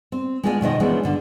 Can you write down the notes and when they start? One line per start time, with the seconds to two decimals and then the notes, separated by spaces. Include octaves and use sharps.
0.12 C4
0.43 G#3 B3 D4 F4 E5 G#5
0.61 B2 D#3 F3 D#5
0.80 E3 F3 G#3 B3 C#4 D4
1.03 G2 D3 F3